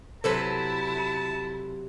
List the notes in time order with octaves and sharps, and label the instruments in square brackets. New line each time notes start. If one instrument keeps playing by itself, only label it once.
[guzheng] C3 F#3 B4 [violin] E4 [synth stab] A4 C5 [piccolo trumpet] A5